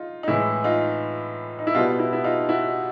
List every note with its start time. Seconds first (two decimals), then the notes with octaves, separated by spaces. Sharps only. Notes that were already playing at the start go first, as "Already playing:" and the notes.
Already playing: D#4 F4
0.23 D#4
0.28 A2 E3 G#3 E4
0.64 D#4 F4
1.59 D#4
1.67 E4
1.75 B2 G3 B3 D#4 F4
1.99 E4
2.13 E4
2.24 D#4 F4
2.49 E4 F#4